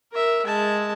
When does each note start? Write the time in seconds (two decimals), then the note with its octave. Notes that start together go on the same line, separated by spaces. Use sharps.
0.12 A#4 E5
0.46 G#3 A5